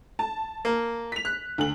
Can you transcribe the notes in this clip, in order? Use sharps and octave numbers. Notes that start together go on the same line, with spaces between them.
A5
A#3
B6 F7
F#6
D2 F#7